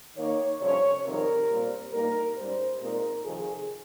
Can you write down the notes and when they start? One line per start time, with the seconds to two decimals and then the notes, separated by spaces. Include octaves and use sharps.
0.17 D#3 A#3 D#4 C#5
0.61 F2 C3 G3 C#4 C#5
1.05 F2 C3 D#3 G3 C4 A#4
1.49 A#2 G3 C4
1.93 A#2 G3 A#3 D#4 A#4
2.37 G#2 G3 C#4 C5
2.81 A#2 G#3 C4 D#4 A#4
3.24 F2 C3 D#3 G#4